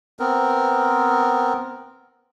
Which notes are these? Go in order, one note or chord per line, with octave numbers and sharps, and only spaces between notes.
B3 C4 A#4